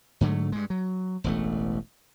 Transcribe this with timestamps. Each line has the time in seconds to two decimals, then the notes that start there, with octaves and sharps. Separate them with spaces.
0.21 G#2 D3 F#3 A3
0.52 G2 G#3
0.70 F#3
1.24 E1 A1 A3